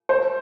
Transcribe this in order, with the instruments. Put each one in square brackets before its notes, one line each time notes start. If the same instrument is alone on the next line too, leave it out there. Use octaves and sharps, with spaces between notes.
[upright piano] C5